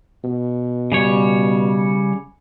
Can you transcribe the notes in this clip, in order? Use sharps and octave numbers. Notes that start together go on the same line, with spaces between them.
B2
C#3 G3 C#5